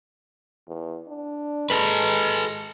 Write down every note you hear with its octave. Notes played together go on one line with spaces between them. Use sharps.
E2
D4
G#3 A4 B4